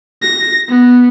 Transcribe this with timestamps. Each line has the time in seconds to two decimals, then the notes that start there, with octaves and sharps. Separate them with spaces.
0.22 A#6
0.69 B3